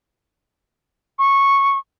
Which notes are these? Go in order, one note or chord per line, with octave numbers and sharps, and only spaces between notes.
C#6